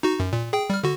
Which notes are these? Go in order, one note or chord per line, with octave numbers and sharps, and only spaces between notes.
D#4 F#4
F#2
A#2
G#4 G5
G3 F6
D3 F#4